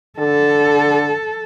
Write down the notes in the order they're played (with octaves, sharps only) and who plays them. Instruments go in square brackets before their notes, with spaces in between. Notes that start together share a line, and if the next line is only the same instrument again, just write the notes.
[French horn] D3 [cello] A4